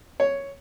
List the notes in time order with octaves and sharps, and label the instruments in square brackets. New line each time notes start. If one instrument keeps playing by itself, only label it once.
[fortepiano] C#5